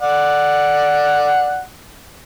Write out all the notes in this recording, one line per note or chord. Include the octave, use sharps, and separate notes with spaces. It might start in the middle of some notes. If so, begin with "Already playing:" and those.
D5 F#5